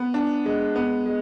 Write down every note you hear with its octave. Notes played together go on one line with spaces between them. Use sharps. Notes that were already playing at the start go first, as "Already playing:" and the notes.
Already playing: B3
D4
G#3
B3
G#3